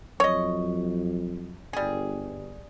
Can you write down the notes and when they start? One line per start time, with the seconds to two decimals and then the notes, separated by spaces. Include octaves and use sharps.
0.20 F2 F#3 C#5 D#5
1.73 G1 G3 G#4